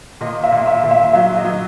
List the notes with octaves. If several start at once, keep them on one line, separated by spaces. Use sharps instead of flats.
A#2 D#5
E5
A#2
E5
A#2
E5
F#3 E5
D#5
F#3